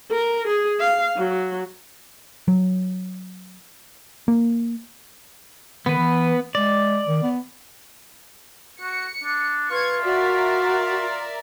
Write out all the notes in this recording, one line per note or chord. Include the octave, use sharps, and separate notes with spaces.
A#4
G#4
F5
F#3
F#3
A#3
D#3 B3 B4
E3
G#3 D5
D#3
B3
F#4 C#7
D4
F4 B4 C#6 G#6
F#4 A#4 D5 E5